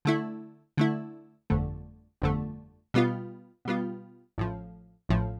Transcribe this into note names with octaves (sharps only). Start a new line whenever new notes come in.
D3 A3 E4
D3 A3 E4
G1 F2 D3 A3
G1 F2 D3 A3
B2 G3 B3 F4
B2 G3 B3 F4
A1 A2 F3
A1 A2 F3